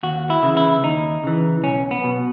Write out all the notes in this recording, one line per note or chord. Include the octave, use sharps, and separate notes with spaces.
D#2 F#4
E4
C#3 E3
E4
D#2 D#4
C#3 E3
B1 C#4
B3
B2